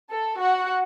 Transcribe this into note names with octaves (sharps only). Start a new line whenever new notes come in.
A4
F#4 F#5